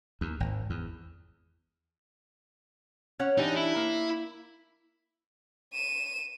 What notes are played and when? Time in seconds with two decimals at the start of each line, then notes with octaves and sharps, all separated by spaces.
0.21 D#2
0.40 G#1
0.70 E2
3.19 C#4 C#5 F#5
3.38 E3 D4 D#4 G4
3.56 E4
3.76 A#3
5.73 D#7 E7